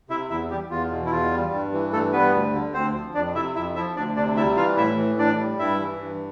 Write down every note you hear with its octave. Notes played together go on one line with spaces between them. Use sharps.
C3 E4 E5
E2 E4 E5
G3 G4
E2 F4
B2
E4
E2 F4
G3
G2
E3
G2 A3 A4
G3 B3 B4
D2
D3
D2 C4 C5
F3
F2 D4 D5
C3 E4 E5
F2 E4 E5
F3 E4 E5
D2 D4 D5
C3 D4 D5
G3 E4 E5
E3 F4 F5
A2 E4 E5
E3
A2 D4 D5
G3
G2 E4 E5
E3
G2